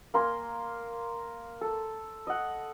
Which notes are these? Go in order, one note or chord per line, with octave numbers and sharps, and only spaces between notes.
A#3 A#4 G#5 C6
A4
D#5 F#5